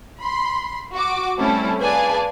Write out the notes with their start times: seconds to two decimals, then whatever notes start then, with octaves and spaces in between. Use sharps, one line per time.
0.20 B5 C6
0.94 F#4 D6
1.38 G3 A3 C4 C#4 E4 A4
1.81 G#4 B4 D5 F5 G#5 A5